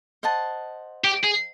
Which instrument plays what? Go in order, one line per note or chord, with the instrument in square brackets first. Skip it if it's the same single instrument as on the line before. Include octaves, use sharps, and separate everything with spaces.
[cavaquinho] C5 D#5 F#5 A5
[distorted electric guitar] G4
G#4